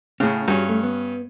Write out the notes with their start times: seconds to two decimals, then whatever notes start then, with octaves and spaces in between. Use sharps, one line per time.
0.20 A2 C#3 C#4 G#4
0.48 G2 C#4 F#4 G#4
0.69 A3
0.83 B3